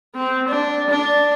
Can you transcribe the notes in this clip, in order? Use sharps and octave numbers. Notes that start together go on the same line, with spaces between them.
C4
D4
D4